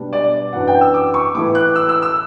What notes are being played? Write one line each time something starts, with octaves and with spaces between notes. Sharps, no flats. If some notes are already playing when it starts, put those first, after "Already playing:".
Already playing: B2 G3 D4
D5
F#2 E3 B3 D4 F#5
G5
E6
D6
C#6
A2 E3 A3 E4 D6
F#6
E6
E6
E6